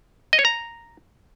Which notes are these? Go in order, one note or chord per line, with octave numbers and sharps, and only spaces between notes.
D#5
C#5
A#5